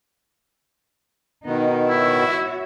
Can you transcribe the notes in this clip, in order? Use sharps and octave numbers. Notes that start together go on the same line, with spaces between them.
B2 D#3 B3 D#4
E4 F#4 C#5 E5